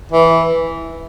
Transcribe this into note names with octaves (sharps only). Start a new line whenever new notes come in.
E3